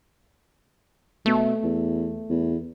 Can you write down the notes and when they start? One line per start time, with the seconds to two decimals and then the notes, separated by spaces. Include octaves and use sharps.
1.26 B2 A3
1.64 E2
2.30 E2